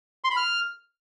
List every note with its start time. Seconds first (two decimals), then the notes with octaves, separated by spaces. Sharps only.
0.24 C6
0.30 B5
0.37 F6